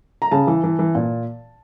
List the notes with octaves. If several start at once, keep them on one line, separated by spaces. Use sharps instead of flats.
A#5
C#3 A5
E3
E3
E3
A#2